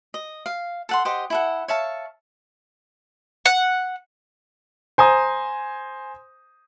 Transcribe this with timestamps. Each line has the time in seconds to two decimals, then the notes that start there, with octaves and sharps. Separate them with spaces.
0.14 D#5
0.46 F5
0.89 A4 F#5 C6
1.05 G4 C5 D#5 F#5
1.30 E4 A4 F#5
1.68 C#5 E5 F5 A5
3.46 F#5
4.98 C5 G#5 A#5 D#6